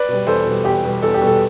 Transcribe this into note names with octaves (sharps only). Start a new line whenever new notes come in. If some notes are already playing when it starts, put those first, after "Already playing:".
Already playing: B4 D5
B2 G3
E2 A4 C5
B2 G3
E2 G4
B2 G3
E2 A4
G4
B2 G3
A4